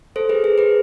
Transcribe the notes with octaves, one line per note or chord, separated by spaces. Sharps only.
A4 C5
G#4 B4
G#4
G#4 B4